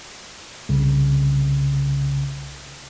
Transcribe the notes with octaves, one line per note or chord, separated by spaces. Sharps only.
C2 C#3